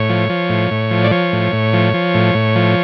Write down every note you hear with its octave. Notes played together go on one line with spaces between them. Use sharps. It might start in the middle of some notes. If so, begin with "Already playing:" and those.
Already playing: A2 C#5
F3
F3
A2
A2
F3
D5
F3 C#5
A2
A2
F3
F3
A2
A2
F3